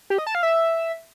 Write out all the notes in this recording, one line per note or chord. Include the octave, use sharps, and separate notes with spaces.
G4
D#5
A5
F5
E5